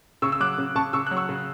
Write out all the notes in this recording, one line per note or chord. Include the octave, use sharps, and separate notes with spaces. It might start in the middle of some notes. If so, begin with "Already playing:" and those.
C#3 C#6 E6
E6
F#3 D6 F#6
C#3
C#3 A5 C#6
C#3 C#6 E6
F#3 F#6
C#6 E6
C#3